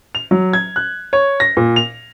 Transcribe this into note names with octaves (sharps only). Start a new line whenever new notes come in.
F7
F#3
G#6
F#6
C#5
A#6
A#2
F7